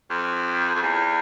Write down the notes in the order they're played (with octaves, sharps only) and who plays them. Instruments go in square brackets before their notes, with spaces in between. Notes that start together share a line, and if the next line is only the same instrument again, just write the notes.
[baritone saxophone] F2
F2
E2